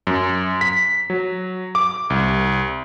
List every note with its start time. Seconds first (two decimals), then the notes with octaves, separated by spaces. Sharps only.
0.07 F#2
0.61 B6
1.10 F#3
1.75 D6
2.10 C2